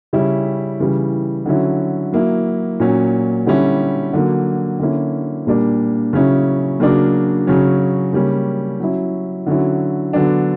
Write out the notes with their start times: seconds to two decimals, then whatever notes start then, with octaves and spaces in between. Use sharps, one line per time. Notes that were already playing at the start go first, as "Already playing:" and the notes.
0.13 C#3 G3 C#4 E4
0.80 C#3 E3 G3
1.46 D3 F#3 C#4 E4
2.13 F#3 A#3 E4
2.80 A#2 F#3 C#4
3.46 D3 G3 C#4 E4
4.13 D3 F#3 A#3
4.80 D3 A#3 C#4 E4
5.47 A#2 G3 A#3 D4
6.13 C#3 F#3 C#4 E4
6.80 C#3 F#3 A#3 D4
7.47 C#3 F#3 C#4
8.13 C#3 G3 A#3 C#4
8.80 F#3 C#4 E4
9.47 D3 F#3 C#4 E4
10.13 D3 F#3 B3 D4